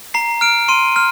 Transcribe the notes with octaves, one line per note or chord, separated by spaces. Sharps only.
A#5 C7
F6 D7
C6 D#7
F6